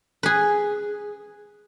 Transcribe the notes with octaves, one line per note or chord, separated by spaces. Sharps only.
G#4 B4